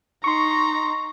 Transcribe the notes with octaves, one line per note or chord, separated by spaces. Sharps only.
D#4 A#5 C6 C#6